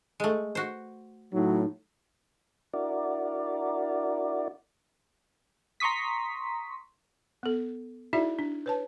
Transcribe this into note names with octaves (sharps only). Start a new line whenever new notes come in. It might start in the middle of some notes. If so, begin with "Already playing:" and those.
G#3 A3
F#4 C5
A2 F#3 D#4
D4 E4 F#4 A#4 D5
A#5 C6 C#6 D#6 B6
B3 A4
D#4 E4 F#4 G#4 D5 E5
D4
B4 C#5 A5